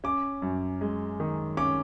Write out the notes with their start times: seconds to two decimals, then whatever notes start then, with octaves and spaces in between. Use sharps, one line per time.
0.04 C#4 D6
0.42 F#2
0.81 G#3
1.20 D#3
1.57 C#4 D6